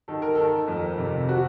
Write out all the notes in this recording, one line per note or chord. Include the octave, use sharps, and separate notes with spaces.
D#3 A4
A#4
D#3 A4
F2
C3
F#4